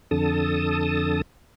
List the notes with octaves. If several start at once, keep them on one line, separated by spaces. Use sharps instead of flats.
F2 D3 A4 A5 D#6